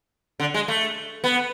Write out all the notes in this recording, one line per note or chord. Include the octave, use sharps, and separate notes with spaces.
D3
G#3
A3
B3